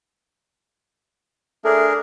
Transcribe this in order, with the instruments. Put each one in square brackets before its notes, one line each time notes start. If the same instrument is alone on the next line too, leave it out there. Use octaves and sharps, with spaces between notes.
[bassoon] A3 [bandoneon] D4 G#4 A#4